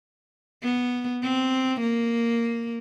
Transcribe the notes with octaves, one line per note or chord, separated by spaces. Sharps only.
B3
C4
A#3